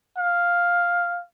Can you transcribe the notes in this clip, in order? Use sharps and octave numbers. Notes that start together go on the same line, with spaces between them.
F5